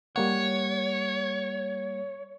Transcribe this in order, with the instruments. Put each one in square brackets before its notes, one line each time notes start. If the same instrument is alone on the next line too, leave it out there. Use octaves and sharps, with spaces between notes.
[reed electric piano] G3 A#3 F#5 [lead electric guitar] C#5